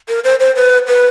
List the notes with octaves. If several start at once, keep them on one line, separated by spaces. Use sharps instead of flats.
A#4
C5
C5
B4
B4